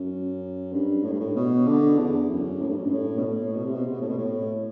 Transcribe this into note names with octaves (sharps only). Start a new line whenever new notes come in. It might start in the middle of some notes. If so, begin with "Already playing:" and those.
Already playing: F#2
G2
A2
G2
A2
B2
D3
E2
F#2
A2
G2
F#2
G2
A2
B2
A2
B2
C3
B2
C3
B2
A2
B2
A2